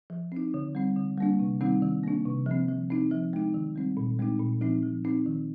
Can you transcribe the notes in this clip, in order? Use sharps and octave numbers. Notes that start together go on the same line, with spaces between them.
F3
C4 D#4
D3
G3 C4
D3
G3 A#3 D4
C3
D#3 G3 C4 D#4
D#3
A#3 D4
C3
F3 C4
F3
C4 D#4
F3
G#3 D#4
D#3
G3 C4
A#2
G#3 C4 D#4
A#2
F3 C4 D#4
F3
C4 D#4
D#3